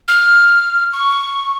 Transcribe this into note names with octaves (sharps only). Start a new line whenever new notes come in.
F6
C#6